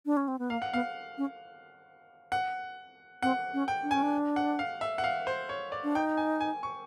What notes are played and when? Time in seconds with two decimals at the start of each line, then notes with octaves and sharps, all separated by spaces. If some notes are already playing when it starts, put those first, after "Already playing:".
0.06 D4
0.17 C#4
0.28 C4
0.39 B3
0.50 A#3 F5
0.62 F#5
0.73 B3 F5
1.18 C#4
2.32 F#5
3.22 C4 F#5
3.53 C#4
3.68 G5
3.83 D4
3.91 C#4 G#5
4.02 D4
4.36 F#5
4.59 F5
4.81 E5
4.98 F#5
5.04 F5
5.27 C5
5.49 C#5
5.72 D5
5.84 D4
5.95 D#4 G5
6.17 G#5
6.40 G#5
6.63 C#6